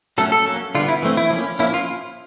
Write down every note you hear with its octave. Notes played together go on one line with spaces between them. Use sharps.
F#3 A3 C#4 A4
A4
F#3 A#3 C#4
D3 G3 B3 F4
E4
E3 A3 C4
E4
F3 A#3 C#4
F3 A#3 C#4 E4
F4